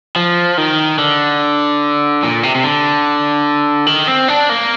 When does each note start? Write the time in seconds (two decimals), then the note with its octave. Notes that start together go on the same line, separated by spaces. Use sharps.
0.16 F3
0.58 D#3
0.99 D3
2.23 A#2
2.43 C3
2.55 C3
2.64 D3
3.86 D#3
4.08 C4
4.28 D4
4.49 A#3